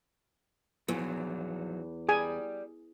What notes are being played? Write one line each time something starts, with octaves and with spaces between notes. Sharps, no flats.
E2 F3 F#3 D#4
G4 G#4 D5 G#5